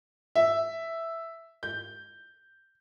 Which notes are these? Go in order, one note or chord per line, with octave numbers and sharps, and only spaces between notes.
E5
G6